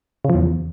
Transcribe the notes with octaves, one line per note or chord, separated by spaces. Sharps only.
C#3
F3
E2